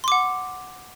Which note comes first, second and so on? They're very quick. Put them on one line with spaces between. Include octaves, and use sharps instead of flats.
C6 D6 F#5